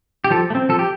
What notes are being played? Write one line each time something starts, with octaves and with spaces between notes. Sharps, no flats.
G4
F3 A4
A3
C4
F3 A4
G4